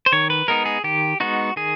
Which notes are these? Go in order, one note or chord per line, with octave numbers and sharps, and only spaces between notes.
C5
D#3 C#5
B4
G#3 B3 D#4 A#4
G#4
D#3 G4
G#3 B3 D#4 F#4
D#3 G#4